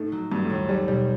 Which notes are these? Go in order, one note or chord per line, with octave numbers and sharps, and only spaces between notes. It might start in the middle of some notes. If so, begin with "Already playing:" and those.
Already playing: A2 A3 D#4 A4
F#3
G2 F#3
A2
D#2
G3 A3
B2 G3